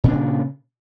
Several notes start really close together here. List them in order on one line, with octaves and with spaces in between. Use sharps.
A#2 D4 C#3